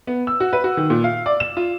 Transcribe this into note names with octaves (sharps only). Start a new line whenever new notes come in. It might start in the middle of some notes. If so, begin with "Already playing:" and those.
B3
E6
F#4
B4
F#4
D#3
A#2
F5
D5
E7
F4